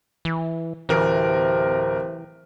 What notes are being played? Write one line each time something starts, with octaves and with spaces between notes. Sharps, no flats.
E3
D1 C3 E3 A#4